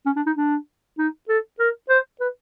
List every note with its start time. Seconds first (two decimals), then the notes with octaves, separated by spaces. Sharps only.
0.06 C#4
0.16 D4
0.26 D#4
0.37 D4
0.98 D#4
1.29 A4
1.59 A#4
1.89 C5
2.20 B4